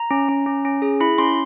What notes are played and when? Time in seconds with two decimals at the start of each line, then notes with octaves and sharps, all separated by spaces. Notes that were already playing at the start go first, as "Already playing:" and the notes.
Already playing: A#5
0.11 C#4
0.29 C#4
0.46 C#4
0.65 C#4
0.82 G#4
1.00 E4 B5
1.18 C#4 C6